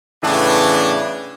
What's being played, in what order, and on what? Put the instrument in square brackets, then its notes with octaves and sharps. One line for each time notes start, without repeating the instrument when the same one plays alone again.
[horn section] A2 C#3 E3 B3 D4